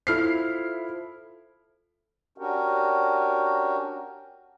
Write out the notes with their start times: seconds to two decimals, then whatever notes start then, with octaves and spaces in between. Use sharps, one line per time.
0.07 E4 F4 A4 C5 F6 C7
2.38 C#4 D4 F#4 G4 A#4